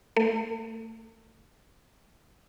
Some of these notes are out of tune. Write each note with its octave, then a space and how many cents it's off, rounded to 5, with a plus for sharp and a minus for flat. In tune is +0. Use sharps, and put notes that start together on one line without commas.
A3 +35